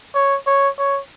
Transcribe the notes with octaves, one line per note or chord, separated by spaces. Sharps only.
C#5
C#5
C#5